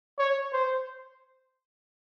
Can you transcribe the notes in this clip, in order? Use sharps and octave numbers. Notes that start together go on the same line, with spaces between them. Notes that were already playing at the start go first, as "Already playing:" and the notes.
C#5
C5